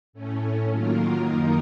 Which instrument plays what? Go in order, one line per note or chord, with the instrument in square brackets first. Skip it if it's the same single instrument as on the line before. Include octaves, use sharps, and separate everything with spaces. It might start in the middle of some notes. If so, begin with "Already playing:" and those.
[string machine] A2 A3 C#4
D#3 F#3 A#3 F4 A#4
F#2 D#3 A#3 D#4 A#4